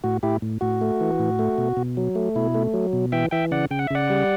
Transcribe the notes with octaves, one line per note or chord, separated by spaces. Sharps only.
A2 F#4
A2 E4 G4
A2
A2 F#4
A3
E3
A2
A3
B2
B2
F#3
A3
B2 E4
A3
F#3
B2
E3 E5 G5
E3 E5 G5
C#3 D5 F#5
C#3 G5
F#5
E5
C#3 D5 F#5
G3